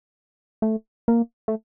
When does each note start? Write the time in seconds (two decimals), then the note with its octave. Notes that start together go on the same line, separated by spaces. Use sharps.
0.62 A3
1.08 A#3
1.48 A3